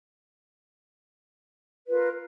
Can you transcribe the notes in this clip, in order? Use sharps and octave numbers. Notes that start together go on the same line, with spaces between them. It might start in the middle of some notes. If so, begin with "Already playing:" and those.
F4 A#4 B4